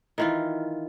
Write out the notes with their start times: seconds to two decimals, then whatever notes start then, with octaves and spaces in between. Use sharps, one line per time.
0.18 D#3 E3 F4